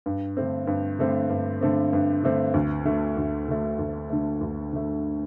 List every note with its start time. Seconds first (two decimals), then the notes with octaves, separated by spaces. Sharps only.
0.06 G2
0.37 D3 A3 C4
0.67 G2
0.99 D3 A3 C4
1.29 G2
1.61 D3 A3 C4
1.93 G2
2.24 D3 A3 C4
2.54 D2
2.85 D3 A3
3.17 D2
3.48 D3 A3
3.79 D2
4.10 D3 A3
4.41 D2
4.73 D3 A3